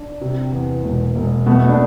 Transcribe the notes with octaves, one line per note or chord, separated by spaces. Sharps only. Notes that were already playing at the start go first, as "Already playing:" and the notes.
Already playing: D4
C3
E2
E1
E1
B2 A3 B3
D4